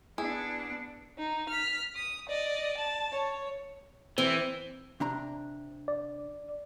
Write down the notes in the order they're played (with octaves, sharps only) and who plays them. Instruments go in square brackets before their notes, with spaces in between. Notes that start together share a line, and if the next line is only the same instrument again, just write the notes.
[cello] B3 D4 [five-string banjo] E4 G#4
[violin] D#4
F6 B6
D#6
D5 D#5
A5
C#5
[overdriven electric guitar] E3 [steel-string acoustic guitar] C4
[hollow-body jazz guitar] C3 D4 A#5
[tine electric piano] D5